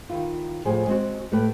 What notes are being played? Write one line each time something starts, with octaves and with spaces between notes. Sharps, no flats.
D#3 E4 F4
A2 F3 G#4 C5 G#5
G#3 C4 F#4
A2 A3 G4 B4